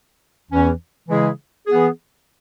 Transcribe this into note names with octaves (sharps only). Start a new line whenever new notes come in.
E2 E3 C#4
C#3 E3 G#3 E4 G#4
E3 B3 G#4